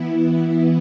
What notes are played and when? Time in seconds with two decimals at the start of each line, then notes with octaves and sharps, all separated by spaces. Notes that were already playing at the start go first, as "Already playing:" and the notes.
Already playing: E3 B3 E4